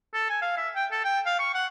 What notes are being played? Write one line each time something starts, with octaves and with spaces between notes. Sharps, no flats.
A4
G#5
F5
E5
G5
A4
G5
F5
C#6
F#5